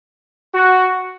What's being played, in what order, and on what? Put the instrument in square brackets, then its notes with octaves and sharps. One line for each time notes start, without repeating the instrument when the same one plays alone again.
[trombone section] F#4